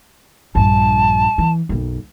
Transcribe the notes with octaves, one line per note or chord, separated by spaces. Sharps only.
A#1 G2 A5
E3
B1 F#2